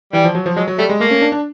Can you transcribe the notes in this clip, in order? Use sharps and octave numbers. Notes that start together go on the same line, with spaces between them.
E3 G3
F3
F#3
F3
F#3 G#3
F#3
G3 A3
G#3
A3 A#3
C#4
D4
D4